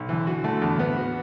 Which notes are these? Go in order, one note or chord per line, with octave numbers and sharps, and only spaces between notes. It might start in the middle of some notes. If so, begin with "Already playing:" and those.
Already playing: B1
D3 E3
F#4
D3 A3
E2
A2 B3
F#4